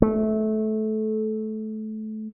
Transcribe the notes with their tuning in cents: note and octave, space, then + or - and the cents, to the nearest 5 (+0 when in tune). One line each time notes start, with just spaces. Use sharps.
A3 -20